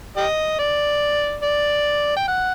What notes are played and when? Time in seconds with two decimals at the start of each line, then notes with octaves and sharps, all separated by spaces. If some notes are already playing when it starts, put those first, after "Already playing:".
0.17 G4 D#5
0.59 D5
1.43 D5
2.17 G5
2.28 F#5